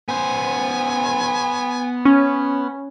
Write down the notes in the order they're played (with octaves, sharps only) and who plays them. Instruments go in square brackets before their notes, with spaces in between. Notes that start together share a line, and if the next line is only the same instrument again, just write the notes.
[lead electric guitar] B3 C5 [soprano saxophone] G#5
[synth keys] C#4